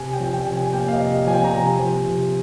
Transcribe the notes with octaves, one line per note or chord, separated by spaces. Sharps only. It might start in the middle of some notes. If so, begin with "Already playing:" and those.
Already playing: C3 G#5
G5
F3
G5
C3
G#5
A#3 G5
F5
D#5
C3
F5
F3 G#5
G5
A#5
C3 G#5
F3
C3